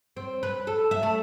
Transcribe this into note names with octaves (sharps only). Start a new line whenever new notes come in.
C4
B4
A4
E5
A3